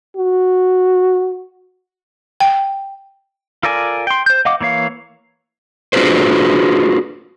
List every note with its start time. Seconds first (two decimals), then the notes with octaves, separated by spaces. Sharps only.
0.17 F#4
2.40 G5
3.63 F4 A4 A#4 D5 G#5
4.07 G5 C6
4.26 C5 G6
4.45 D#5 F5 F#5 D6
4.61 E3 A#3 C#5 F5
5.93 D4 F4 F#4 G#4 B4 C5